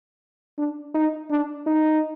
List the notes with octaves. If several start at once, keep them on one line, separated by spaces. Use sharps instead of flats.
D4
D#4
D4
D#4